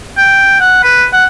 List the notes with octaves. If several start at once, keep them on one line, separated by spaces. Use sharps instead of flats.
G5
F#5
B4
F#5